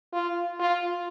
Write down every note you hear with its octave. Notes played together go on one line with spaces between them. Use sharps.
F4
F4